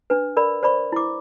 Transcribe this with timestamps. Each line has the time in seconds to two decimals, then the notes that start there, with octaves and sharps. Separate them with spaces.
0.10 D4 B4
0.37 A#4 D5 B5
0.63 C5 D5 B5 C#6
0.92 E4 D6